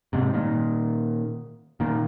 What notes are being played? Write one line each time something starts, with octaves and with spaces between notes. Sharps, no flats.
G#2 C3
A#2 D#3
A#2 D#3